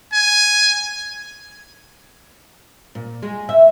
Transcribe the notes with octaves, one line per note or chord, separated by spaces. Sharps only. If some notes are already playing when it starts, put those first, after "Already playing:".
G#5
A#2
G#3
E5